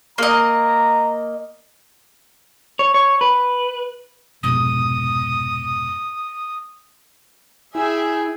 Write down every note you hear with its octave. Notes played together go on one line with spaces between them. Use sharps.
A#3 D#5 A#5
C#5
C#5
B4
F1 G#2 B2 D#6
E4 G#4 E5 G5 G#5